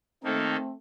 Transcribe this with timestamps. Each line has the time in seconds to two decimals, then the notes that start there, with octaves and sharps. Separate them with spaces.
0.23 D#3 A3 A#3 C4 D#4 A4